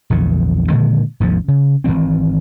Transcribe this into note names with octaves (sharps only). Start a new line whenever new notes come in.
A#1 E2 D3
A#2 D3 D#3 G#3
G#1 D#2 C3 F3
C#3
G#1 F2 E3 C4